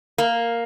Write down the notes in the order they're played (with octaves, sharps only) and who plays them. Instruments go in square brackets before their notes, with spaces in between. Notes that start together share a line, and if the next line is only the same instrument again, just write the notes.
[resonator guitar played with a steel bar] A#3